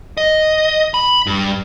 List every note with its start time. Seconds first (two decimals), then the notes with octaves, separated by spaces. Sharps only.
0.17 D#5
0.94 B5
1.27 G2